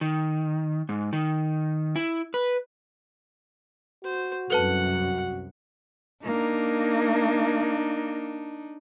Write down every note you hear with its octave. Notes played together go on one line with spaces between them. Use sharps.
D#3
G#2
D#3
E4
B4
F#4 C5
C2 F#2 A4 B4 F#5 A5
A#3 D4 D#4